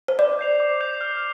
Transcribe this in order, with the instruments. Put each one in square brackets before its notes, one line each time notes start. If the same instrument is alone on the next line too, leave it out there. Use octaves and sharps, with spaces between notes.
[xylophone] C5
[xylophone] D5 [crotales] D6
[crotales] G6 C7 F7
D6
G6 C7 F7
F6